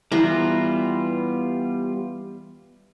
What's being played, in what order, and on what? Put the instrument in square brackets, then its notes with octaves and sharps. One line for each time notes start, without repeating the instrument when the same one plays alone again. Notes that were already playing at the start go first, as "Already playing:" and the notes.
[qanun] E3 A#5 C6 [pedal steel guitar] G3 B3 F4